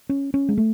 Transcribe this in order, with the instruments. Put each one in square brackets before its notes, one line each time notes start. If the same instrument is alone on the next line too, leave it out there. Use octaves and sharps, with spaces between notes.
[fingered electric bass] C#4
C#4
G#3
A3